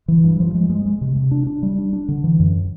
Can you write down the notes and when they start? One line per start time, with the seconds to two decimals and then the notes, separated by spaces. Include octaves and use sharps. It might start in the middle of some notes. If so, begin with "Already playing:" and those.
0.08 E3
0.24 G2
0.40 F3
0.55 G#3
0.70 G#3
0.86 G#3
1.01 C3
1.16 C3
1.31 D4
1.47 D4
1.63 G3
1.78 D4
1.93 D4
2.08 D3
2.24 E3
2.40 F#2